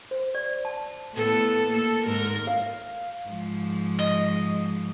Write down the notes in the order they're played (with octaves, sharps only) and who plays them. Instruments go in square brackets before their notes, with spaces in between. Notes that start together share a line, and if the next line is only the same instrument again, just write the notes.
[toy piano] C5
D5
A5
[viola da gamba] A2 B3 A4
A#3 A4
G#2 A#4
[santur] F5
[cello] G#2 F3
[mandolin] D#5